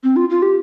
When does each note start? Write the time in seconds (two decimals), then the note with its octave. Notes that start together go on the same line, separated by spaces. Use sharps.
0.04 C4
0.16 F4
0.30 F4
0.42 G4